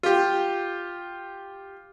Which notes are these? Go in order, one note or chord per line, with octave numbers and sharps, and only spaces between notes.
F4 G4